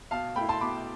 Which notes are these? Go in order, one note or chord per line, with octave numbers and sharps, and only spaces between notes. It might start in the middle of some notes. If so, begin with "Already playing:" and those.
B2 F5 A5
A3 E4 G5 B5
A5 C6
B2 B5 D6